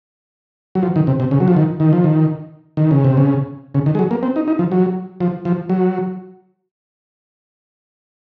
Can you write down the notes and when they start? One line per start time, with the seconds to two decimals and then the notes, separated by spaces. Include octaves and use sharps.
0.75 F#3
0.83 F3
0.96 D#3
1.07 C3
1.20 C3
1.31 C#3
1.40 F#3
1.48 F3
1.56 D#3
1.80 D#3
1.93 F3
2.04 D#3
2.77 D#3
2.91 C#3
3.04 C3
3.17 C#3
3.74 C#3
3.86 D#3
3.95 G#3
3.99 F#3
4.11 A#3
4.23 C4
4.36 D#4
4.48 D#4
4.59 F3
4.72 F#3
5.21 F3
5.45 F3
5.70 F#3